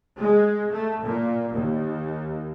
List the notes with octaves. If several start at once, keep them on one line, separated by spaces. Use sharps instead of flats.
G#3
A3
A#2
D#2